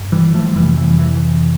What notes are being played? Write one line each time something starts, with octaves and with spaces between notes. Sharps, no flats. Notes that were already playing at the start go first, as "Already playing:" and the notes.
Already playing: G2
E3 G3
F3 A3
F2 C3 E3 G3
E3
E3